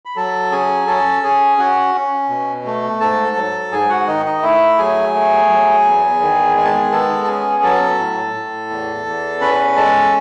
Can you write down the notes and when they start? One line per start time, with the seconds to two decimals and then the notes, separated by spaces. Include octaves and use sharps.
0.05 B5
0.16 F#3 A4 A5
0.51 C#4 G#4 G#5
0.87 C#4 A4 A5
1.23 C#4 G#4 G#5
1.58 C#4 F#4 F#5
1.95 C#4
2.29 B2
2.65 A3
3.00 G#2 A4 A5
3.37 F#3
3.72 G#2 G#4 G#5
3.89 F#4 F#5
4.07 D#3 D#4 D#5
4.26 D#4 D#5
4.43 A3 E4 E5
4.78 F#3 G#4 G#5
5.14 A3
5.49 F#3
5.85 E2
6.22 D#3
6.56 G#3 G#5
6.64 A5
6.72 G#4 G#5
6.92 B3 A4 A5
7.24 A5
7.27 C#4 G#4 G#5
7.63 F#3 A4 A5
7.99 A2
8.34 A2
8.70 E2
9.06 E2
9.41 C#4 B4 B5
9.76 G#3 A4 A5